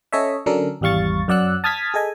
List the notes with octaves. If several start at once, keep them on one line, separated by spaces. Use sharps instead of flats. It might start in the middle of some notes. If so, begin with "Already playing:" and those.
C#4 A4 C#5 D#5 E5
D3 F#3 C#4 D4 A4 A#4
G#1 E2 G3 F5 C#6 A6
F#2 F#3 D5 F#5 E6 F#6
A5 D#6 F6 G#6 A6 B6
G#4 A4 D#5 G#5